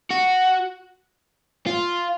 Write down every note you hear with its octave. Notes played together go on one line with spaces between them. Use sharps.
F#4
F4